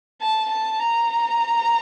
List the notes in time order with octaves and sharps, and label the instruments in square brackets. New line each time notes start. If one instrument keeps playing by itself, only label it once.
[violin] A5
A5
A#5